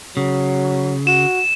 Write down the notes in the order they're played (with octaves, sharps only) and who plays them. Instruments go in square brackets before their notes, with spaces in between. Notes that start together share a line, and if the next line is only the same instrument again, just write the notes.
[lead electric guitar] C#3 [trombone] F#3
[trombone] F#4 [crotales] E7